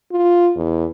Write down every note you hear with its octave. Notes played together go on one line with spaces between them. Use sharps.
F4
E2